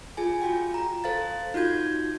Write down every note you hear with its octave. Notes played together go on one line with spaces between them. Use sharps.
F4 G#4 G#5
F4 F#4 G5
A#5
A4 C5 F5 A6
D#4 F4 F#4 G6 G#6